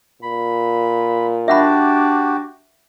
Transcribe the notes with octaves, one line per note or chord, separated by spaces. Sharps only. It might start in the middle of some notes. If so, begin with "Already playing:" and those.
A#2 B5
D4 F#4 G4 E5 F#5 B5